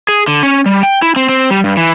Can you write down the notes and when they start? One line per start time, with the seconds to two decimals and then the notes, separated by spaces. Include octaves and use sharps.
0.08 G#4
0.28 D3
0.43 C#4
0.66 G3
0.83 G5
1.02 E4
1.16 C4
1.29 C4
1.51 G3
1.64 G2
1.77 E3